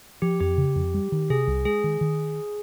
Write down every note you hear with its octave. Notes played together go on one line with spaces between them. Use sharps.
F3 G4
F2 G4
C#3
F2
G3
D#3
C3 G#4
C2
G#3 G#4
D#3
D#3